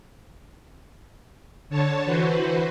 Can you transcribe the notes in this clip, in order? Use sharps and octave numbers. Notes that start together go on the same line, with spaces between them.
D3 C#5 A5
E3 F#4 B4 C5